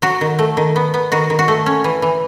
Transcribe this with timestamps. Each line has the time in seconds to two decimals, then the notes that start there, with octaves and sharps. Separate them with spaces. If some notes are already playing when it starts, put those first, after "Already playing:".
0.02 F#3 F#4
0.21 D#3
0.39 A3
0.57 D#3
0.76 B3
0.94 B3
1.12 D#3 F#4
1.30 D#3
1.39 F#4
1.48 A3
1.66 C#4
1.84 E3
2.02 E3